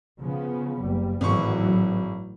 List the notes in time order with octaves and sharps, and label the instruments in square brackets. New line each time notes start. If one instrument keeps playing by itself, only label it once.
[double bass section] C#3 F3 B3
F#1 G3
[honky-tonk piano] G#1 C#6 [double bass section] A2 E3 F#3